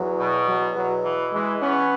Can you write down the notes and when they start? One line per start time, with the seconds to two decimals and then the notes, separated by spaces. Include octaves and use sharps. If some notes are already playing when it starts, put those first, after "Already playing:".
Already playing: E2 F#3
0.20 B2
0.48 E2 F#3
0.76 B2 F#3
1.05 E3
1.33 E3 G#3
1.61 B3 C#4